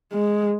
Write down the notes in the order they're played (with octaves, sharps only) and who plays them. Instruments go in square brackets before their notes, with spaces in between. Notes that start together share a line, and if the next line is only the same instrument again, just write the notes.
[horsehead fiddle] G#3